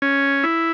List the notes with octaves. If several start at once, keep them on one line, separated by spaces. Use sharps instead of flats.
C#4
E4